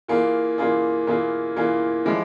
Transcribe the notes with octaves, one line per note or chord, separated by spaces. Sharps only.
E3 A#3 F4 G#4
E3 A#3 F4 G#4
E3 A#3 F4 G#4
E3 A#3 F4 G#4
F3 G#3 E4 G4